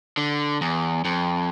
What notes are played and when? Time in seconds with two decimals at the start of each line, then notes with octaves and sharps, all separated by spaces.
0.17 D3
0.61 E2
1.05 F2